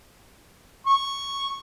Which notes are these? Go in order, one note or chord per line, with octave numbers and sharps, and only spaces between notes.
C#6